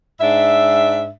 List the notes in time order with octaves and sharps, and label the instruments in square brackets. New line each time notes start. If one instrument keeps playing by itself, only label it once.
[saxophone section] G#2 D4 E5